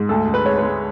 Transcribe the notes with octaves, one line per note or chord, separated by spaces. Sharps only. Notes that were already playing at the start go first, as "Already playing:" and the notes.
Already playing: G#2
D2 A4
D2
B4
G#3 C#5
G#3 B4